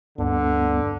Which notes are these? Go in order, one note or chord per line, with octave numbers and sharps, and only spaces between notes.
D2 G2 D3 B3